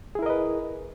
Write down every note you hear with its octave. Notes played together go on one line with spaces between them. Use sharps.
E4 G#4 A#4 B4 D#5